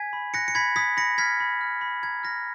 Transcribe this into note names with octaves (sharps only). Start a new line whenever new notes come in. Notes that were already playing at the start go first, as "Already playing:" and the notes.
Already playing: G#5 G#6 B6
B5
F#6 A#6 C#7
C#7
B5 G#6 B6
D#6 G#6 B6
B5 A#6 C#7
F6 G#6 B6
B5
F6
B5
A#5 G#6
F6 A#6